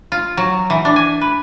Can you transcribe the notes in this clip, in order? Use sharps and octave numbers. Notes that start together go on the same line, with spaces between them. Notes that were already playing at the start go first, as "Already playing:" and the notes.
F4
F#3
E3
D4
G#5
B4